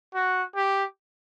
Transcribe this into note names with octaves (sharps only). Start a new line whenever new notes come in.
F#4
G4